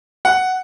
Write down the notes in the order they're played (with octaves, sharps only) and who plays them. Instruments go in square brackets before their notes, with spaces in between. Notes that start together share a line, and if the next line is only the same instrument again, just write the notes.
[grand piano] F#5